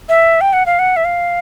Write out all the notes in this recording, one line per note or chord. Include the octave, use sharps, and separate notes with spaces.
E5
G5
F#5
F5
F#5
E5
F5